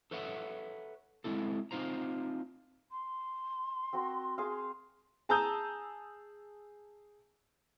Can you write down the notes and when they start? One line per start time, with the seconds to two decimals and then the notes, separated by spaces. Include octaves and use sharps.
0.11 A4 B4 C#5 E5 F#5
1.24 G#3 C4 E4 A4
1.71 C4 D#4 F4 C5 A#5
2.91 C6
3.93 C4 F#4 A#4
4.38 G#4 C5 F5
5.29 G#4 A5 A#5 D#6 E6 G6